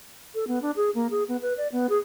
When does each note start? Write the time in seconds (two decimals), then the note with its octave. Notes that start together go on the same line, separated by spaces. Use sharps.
0.35 A4
0.48 B3
0.62 D4
0.76 G#4
0.95 A#3
1.11 G#4
1.28 B3
1.42 B4
1.58 D5
1.72 B3
1.89 G#4